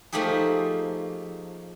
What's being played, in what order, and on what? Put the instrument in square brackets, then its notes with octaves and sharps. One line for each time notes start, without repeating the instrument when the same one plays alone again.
[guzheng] F3 A3 A#3 D#4 G4 G#4